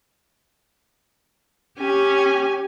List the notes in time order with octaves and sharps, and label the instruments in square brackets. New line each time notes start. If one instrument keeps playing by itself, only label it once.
[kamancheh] C#4 G#5 [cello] G4